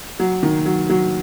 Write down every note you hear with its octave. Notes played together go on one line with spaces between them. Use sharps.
F#3
D#3
F#3
F#3